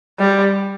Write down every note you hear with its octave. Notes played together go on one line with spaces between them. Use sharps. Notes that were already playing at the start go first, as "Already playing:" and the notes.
G3